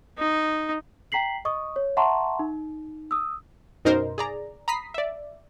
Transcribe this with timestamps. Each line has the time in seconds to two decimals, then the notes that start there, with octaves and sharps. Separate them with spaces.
0.18 D#4
1.12 G5 A#5 B6 C7 F#7
1.45 D#5 C#6 D#6
1.76 C#5
1.97 E5 F#5 A5 A#5 C6 C#6
2.39 D#4
3.11 D#6 E6
3.85 F#2 B2 D#4 A#4 C5
4.18 G#4 D5 A#5
4.68 A#5 B5 D#6 B6 C7
4.94 D5 E5